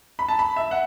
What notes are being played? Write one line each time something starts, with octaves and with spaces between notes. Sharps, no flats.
B5
A5
B5
E5
F#5